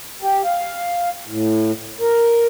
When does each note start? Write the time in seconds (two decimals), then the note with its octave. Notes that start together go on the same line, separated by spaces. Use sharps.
0.22 G4
0.44 F5
1.27 A2
2.00 A#4